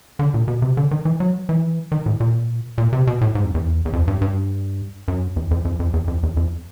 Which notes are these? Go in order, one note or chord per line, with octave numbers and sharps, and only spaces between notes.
D3
A#2
B2
C3
D3
D#3
E3
F#3
E3
D#3
A2
A#2
A#2
C3
B2
A2
G#2
F2
E2
E2
F2
G2
G2
F#2
E2
F2
F2
F2
E2
F2
E2
F2